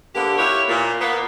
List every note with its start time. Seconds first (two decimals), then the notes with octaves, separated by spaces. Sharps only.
0.15 D3 G3 A#3 B3 G4
0.38 E4 F4 G4 B4 C#5
0.69 A#2
1.00 A#3 B3